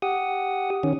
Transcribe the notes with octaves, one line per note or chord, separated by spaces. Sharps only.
G4 F#5 D#6
D#3 C#4